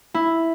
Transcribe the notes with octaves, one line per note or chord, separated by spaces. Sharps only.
E4